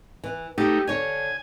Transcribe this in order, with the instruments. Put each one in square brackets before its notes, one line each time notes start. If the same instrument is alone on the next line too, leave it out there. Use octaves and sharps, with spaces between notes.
[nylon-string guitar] E3
[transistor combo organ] A3 D#4 [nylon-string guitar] G4
[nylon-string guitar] D3 C#5 [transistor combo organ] G#5